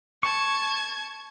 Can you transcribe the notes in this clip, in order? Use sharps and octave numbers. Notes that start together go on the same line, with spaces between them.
A5 C#6 G#6